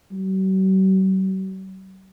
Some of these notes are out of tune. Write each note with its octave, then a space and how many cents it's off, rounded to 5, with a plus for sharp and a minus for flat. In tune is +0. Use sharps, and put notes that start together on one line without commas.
F#3 +45